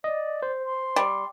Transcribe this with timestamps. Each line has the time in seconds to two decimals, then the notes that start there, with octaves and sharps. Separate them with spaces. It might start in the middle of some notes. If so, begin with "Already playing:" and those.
0.04 D5 D#5
0.42 C5
0.64 C6
0.96 G3